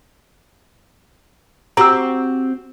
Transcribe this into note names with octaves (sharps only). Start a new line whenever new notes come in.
C4 F#4 G4 A#5 E6